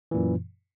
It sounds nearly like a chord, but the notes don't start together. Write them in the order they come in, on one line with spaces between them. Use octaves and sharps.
E3 A#2 F#2